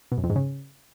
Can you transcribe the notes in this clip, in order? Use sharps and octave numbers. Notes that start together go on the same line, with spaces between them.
B2
F#2
F2
G#2
C#3